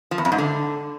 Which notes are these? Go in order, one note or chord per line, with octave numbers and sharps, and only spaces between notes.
F3
E2
F2
G#2
D3